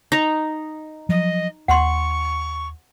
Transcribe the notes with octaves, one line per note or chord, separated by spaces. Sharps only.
D#4 A#5
F3 F#3 D#5
D#2 F#5 C6 C#6